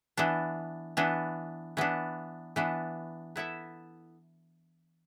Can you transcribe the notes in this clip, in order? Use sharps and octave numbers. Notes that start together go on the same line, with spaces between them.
E3 B3 D4
E3 B3 D4
E3 B3 D4
E3 B3 D4
B3 E4 A4 E5